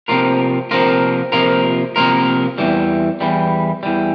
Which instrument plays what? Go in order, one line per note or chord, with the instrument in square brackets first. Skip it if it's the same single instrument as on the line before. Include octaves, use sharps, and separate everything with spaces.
[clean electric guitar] C3 F3 A#3 F4 A#4
C3 F3 A#3 F4 A#4
C3 F3 A#3 F4 A#4
C3 F3 A#3 F4 A#4
E2 E3 G3
E2 E3 G3
E2 E3 G3